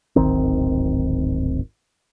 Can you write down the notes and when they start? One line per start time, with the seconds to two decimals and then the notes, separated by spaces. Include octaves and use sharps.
0.16 D1 G#1 D#3 C4